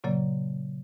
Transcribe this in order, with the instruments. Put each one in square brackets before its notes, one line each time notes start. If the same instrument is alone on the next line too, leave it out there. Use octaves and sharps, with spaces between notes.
[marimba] A#2 C#3 F#3 A#3 D5